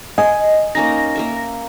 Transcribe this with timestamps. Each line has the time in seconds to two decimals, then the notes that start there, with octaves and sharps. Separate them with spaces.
0.18 D#5 G#5
0.75 A#3 C#4 D#4 A#6
1.15 A#3 A#4 E5